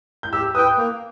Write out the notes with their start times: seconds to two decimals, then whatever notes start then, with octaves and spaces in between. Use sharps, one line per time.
0.23 G6
0.32 G4 E6
0.55 B4 G5 D#6
0.78 A#3